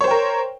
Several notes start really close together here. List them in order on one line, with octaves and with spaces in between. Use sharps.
C#5 C5 G5 A#4